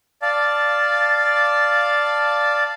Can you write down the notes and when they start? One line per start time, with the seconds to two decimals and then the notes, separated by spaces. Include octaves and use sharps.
0.22 D5 F5 A5